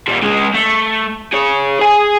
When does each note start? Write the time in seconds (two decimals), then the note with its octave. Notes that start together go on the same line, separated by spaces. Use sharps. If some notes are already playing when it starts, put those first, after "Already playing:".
0.08 A#2 G3
0.23 G#3 C#4
0.54 A3
1.33 G#4 C#5
1.79 G#4 G#5